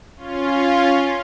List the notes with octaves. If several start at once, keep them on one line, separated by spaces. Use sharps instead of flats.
C#4 F4